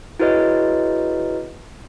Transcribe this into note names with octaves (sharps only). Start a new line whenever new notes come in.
E4 F#4 G#4 B4 C#5 D#5